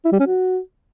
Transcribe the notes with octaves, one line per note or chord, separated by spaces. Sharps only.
E4
G3
C#4
F#4